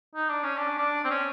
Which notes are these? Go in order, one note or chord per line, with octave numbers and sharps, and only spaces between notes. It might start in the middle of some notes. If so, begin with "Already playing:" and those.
D#4
D4
C#4
D4
D4
C4
C#4